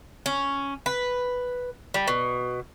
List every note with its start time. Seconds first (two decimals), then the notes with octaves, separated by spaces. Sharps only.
0.26 C#4
0.86 B4
1.94 G3
2.08 B2